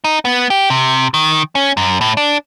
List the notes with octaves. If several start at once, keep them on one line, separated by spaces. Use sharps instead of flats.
D#4
B3
G4
C3
D#3
C#4
F#2
A2
D4